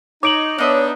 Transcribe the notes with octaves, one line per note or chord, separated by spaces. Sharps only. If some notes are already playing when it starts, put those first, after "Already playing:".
D#4 C#5 D6 D7 F#7
B3 D4 D#4 C#5 D#5 E5